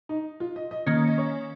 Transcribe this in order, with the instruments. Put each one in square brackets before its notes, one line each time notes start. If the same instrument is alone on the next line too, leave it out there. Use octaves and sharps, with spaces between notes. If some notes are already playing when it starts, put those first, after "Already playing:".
[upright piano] D#4
F4
D#5
D#5
[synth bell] D#3 A#3 C#4 [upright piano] D#5
[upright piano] D#5
C#5